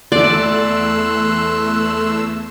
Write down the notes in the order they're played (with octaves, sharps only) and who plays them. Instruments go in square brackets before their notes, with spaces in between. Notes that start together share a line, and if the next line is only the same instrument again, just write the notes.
[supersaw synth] E2 A3 E6 [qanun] D5 [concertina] C6 F#6